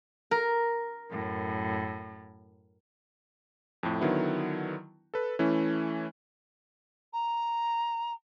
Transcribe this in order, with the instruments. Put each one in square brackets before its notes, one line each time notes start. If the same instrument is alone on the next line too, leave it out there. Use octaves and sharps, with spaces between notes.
[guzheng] A#4
[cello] F#2 A2
[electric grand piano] F2 A2
D3 D#3 F#3 B3 E4
A4 B4
E3 A3 C#4 E4
[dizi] A#5